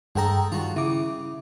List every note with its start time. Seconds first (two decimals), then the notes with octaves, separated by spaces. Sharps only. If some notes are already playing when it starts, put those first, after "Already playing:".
0.15 G2 G#3 A4 D#5 G5 A#5
0.52 D#3 G3 F4 F#4
0.76 C#3 E4 D6